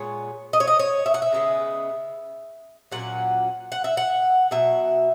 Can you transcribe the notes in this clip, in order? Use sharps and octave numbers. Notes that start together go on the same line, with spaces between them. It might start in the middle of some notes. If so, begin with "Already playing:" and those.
Already playing: A#2 G#3 B3 C#5
D#5
C#5
D#5
C#5
E5
F#5
E5
C#3 G#3 B3
A#2 F#3 A#3 C#4 F#5
F#5
E5
F#5
B2 F#3 E5